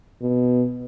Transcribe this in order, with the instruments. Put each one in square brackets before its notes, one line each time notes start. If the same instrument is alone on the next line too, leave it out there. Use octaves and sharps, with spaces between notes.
[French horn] B2